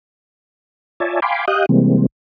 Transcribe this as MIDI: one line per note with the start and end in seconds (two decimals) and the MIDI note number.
1.00 1.20 65
1.00 1.20 73
1.00 1.20 74
1.00 1.20 76
1.00 1.20 80
1.00 1.20 81
1.22 1.45 77
1.22 1.45 79
1.22 1.45 80
1.22 1.45 83
1.22 1.45 84
1.22 1.45 86
1.48 1.66 67
1.48 1.66 75
1.48 1.66 77
1.48 1.66 87
1.48 1.66 90
1.48 1.66 91
1.69 2.06 48
1.69 2.06 52
1.69 2.06 55
1.69 2.06 56
1.69 2.06 58
1.69 2.06 60